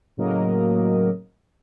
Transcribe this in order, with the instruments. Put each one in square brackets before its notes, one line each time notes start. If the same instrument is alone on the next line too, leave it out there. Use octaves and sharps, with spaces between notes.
[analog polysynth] A2 C#3 F#3 A#3 A#4 D#5